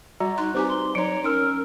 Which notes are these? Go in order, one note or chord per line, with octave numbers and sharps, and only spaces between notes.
G3 F#4 D5 A#5
D#4 C6 F#6
C4 D#4 G4 B4 C5 G#5 D6
C6
F#3 D#4 C#5 A#5 C#7 D7
C#4 D#4 A#4 E6 F6 D7